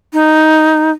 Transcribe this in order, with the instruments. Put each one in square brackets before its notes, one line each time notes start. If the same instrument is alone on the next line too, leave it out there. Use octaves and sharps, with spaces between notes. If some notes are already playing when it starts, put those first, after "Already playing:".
[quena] D#4